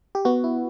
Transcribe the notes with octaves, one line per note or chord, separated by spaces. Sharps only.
G4
B3 F#4
E4